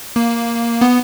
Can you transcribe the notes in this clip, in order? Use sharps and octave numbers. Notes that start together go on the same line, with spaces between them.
A#3
B3